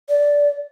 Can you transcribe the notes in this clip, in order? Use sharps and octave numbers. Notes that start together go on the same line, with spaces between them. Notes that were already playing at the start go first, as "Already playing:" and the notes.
D5